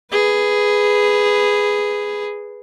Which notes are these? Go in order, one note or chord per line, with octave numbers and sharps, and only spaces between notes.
G#4 B4